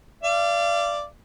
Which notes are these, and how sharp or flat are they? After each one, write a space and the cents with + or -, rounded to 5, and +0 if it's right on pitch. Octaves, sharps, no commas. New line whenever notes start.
D5 +0 F5 -35